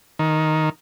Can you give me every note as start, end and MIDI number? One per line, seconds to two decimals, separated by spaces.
0.19 0.69 51